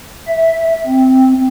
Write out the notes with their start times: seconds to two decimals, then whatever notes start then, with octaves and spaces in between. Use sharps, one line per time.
0.27 E5
0.86 C4